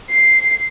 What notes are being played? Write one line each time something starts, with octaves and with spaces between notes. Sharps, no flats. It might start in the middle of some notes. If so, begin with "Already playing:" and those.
C7